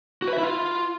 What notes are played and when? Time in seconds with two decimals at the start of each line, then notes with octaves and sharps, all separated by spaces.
0.22 F#4
0.28 B4
0.33 E5
0.38 E4
0.43 F4